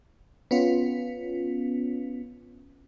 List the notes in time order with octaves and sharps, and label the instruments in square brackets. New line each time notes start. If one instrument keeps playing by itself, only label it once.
[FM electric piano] B3 C#4 F4